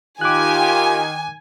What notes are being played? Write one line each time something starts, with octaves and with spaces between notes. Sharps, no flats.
D#3 F4 G4 G#5 D6 F#6